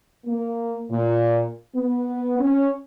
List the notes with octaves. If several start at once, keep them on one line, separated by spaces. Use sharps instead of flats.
A#3
A#2
B3
C#4